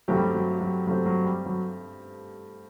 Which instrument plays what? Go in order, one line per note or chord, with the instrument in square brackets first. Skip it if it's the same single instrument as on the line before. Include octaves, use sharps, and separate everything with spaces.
[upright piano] G2 D3 A3 C4 G4 [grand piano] F#3
[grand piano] G3
F#3
F#3
F#3
[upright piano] G2 D3 A3 C4 G4 [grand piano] F#3
[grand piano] F#3
G3
F#3